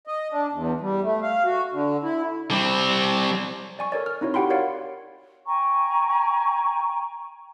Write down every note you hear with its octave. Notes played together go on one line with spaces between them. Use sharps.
D#5
D4
E2
G3
A3
F5
F#4
D3
E4
G3 C4
D5 G#5 C#6
A4 A#4 C#5 D5
F6
C4 D#4 E4 F#4 C#5
F#4 G4 F#5 G5 B5 C6
F#4 A#4 C#5 D5 F5 F#5
G5 G#5 A#5 C#6